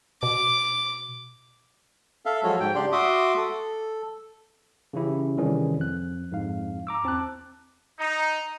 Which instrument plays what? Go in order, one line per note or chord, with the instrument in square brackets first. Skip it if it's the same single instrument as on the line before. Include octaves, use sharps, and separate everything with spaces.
[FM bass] B2 [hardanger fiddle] D6
[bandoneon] A4 E5 F5
F3 F#3 G#3 F#4 A4 C#5
G#2 G5
C#3 D4 G4 D5 C6
F#4 E5 C6 D6 D#6
A4
[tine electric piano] C#3 E3 C#4 E4 G4
C3 D#3 E3 G3 C#4 G#4
F2 F#6
F2 G#2 F5
A#5 D6 E6
E2 C4 A5 D6 F#6
[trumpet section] D#4